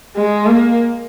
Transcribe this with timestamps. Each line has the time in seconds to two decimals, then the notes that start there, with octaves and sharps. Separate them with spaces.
0.16 G#3
0.46 A#3